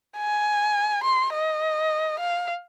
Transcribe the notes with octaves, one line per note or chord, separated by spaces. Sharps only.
G#5
C6
D#5
F5